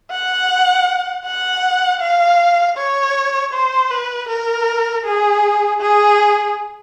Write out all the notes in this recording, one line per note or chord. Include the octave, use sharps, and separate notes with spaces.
F#5
F#5
F5
C#5
C5
B4
A#4
G#4
G#4